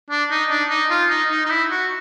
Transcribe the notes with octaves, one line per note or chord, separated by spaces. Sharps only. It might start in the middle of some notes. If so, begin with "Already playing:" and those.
D4
D#4
D4
D#4
F4
D#4
D#4
D#4
E4
F#4